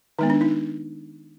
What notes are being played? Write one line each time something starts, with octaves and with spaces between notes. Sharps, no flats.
D#3 G#3 B3 D#4
D4
D#4